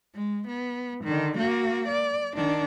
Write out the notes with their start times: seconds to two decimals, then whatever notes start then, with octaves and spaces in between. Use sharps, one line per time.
0.15 G#3
0.47 B3
1.04 D3 D#3
1.37 A#3 F#4
1.88 D5
2.36 D#3 D4